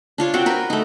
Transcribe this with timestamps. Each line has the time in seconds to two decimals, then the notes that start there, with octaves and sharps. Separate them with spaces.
0.18 D4 F4 C#5
0.34 C4 F#4 F#5 G5
0.46 A#4 B4
0.70 A3 D#4